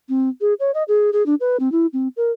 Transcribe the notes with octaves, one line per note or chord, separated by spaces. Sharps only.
C4
G#4
C#5
D#5
G#4
G#4
D4
B4
C4
E4
C4
A#4